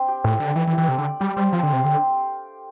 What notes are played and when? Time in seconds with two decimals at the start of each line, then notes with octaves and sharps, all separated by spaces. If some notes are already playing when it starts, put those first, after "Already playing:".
Already playing: C4 D4 C5
0.08 G4
0.24 A2 A3
0.40 D3 D5
0.56 E3 D4
0.67 E3
0.72 G4
0.78 E3
0.88 C3 A3
0.98 D3
1.05 D5
1.20 G3 G4
1.36 G3 C5
1.53 F3 C4
1.63 D3
1.69 C3 F5
1.84 D3 G4